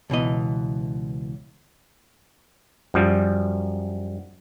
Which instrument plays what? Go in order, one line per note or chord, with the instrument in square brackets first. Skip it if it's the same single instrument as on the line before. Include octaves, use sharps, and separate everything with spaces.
[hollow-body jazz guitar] C#2 B2 E3 D#5
[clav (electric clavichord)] F#2 F3 G3